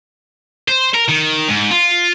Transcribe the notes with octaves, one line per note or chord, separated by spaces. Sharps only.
C5
A#4
D#3
G#2
F4